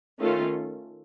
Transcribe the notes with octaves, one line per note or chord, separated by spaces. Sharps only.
D#3 A3 C#4 F4 A4